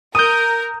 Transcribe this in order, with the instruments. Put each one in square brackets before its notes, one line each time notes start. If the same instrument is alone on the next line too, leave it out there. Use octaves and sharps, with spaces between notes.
[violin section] A#4 [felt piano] D#6 [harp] G6 D#7